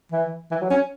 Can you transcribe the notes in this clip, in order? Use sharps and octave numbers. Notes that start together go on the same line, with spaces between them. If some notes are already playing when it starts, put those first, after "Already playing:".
E3
E3
F#3
C#4